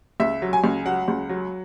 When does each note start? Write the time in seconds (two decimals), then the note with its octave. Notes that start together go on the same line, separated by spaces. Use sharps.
0.20 C#2 E5
0.42 F#3
0.53 G#5
0.64 C#2
0.85 F#3 F#5
1.08 C#2
1.29 F#3